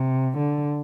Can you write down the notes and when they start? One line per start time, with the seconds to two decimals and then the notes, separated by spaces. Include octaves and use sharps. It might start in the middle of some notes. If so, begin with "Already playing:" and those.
Already playing: C3
0.37 D3